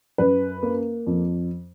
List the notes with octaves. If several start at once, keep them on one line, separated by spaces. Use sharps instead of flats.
F#2 B4
A#3
F2